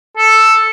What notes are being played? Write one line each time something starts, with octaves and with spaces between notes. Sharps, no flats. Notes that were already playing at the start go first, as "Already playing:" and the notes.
A4